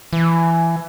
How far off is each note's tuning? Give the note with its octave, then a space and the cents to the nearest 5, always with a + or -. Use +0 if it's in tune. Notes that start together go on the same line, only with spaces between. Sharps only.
E3 +20